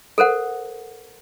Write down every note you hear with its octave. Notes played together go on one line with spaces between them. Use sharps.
A4 A#4 C5 F#5